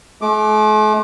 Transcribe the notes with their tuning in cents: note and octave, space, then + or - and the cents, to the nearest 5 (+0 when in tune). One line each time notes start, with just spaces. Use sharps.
A3 -45 D6 +0